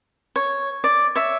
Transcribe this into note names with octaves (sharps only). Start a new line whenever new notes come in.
C#5
D5
C#5 E5